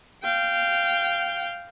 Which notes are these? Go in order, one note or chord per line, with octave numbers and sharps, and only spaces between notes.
F5 G5